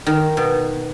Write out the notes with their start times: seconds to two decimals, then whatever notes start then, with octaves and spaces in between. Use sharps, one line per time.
0.06 D#3
0.37 B2